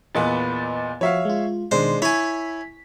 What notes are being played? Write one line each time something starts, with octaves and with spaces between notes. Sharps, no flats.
E2 A#2 B3 D#5 B5 A6
F3 F#4 C#5 E5 F5
G#3 F4
B2 D#3 G#3 D4 C5
E4 C#5 G#5 B6